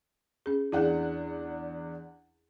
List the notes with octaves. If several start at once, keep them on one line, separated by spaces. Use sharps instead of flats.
C#4 G#4
E2 D4 E4 G#4 F#5